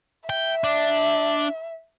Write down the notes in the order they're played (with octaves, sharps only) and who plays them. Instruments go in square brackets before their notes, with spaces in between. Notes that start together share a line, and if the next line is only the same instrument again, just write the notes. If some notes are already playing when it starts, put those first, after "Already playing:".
[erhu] E5 [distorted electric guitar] G5
[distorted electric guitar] D4